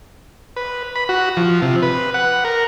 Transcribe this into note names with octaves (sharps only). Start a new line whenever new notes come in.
B4
B5
F#4
F3
C3
B4
F#5
A#4